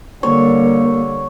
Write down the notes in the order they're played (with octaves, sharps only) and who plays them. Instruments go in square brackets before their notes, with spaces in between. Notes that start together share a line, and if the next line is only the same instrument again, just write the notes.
[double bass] D3 G3 [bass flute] A#3 [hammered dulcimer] C#5